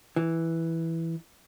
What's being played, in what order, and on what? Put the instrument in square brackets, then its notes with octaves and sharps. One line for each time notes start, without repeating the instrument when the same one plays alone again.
[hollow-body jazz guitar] E3